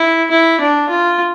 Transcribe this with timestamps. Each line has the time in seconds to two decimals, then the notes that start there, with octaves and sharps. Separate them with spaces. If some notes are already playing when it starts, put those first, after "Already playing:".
Already playing: E4
0.31 E4
0.61 D4
0.89 F4